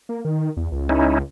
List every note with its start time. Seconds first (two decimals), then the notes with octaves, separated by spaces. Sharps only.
0.09 A#3
0.25 D#3
0.57 E2
0.72 C#2
0.89 C#4 D#4 E4